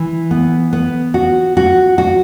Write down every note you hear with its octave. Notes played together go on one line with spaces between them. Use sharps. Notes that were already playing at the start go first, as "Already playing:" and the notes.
Already playing: E3
B3
B3
F#4
F#4
F#4